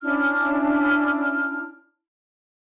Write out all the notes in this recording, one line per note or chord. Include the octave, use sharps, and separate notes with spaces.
C#4 D4 E4 F6